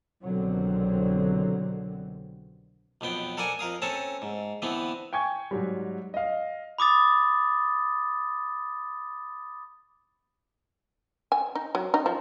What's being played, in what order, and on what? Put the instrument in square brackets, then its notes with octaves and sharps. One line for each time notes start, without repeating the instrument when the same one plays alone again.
[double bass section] C2 B2 D3 D#3 F#3 C4
[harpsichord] B1 F2 B3 G5
A4 A#4 D5 F#5 G#5
F2 A#4 F5 D#6
C4 C#4 A4 C#5 A5 A#5
G#2
D3 E3 B3 C4
[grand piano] G5 G#5 C#6 G#6
G#2 F#3 G3
D#5 F5
[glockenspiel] B5 D6 D#6 A6
[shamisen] G#5
D#4
F#3
D#4
F3